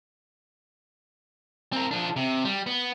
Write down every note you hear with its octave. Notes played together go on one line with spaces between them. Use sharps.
C4 A#4
F3 D4
C3
G3
B3